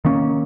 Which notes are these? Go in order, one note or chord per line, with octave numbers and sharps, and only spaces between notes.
D#3 A#3 C#4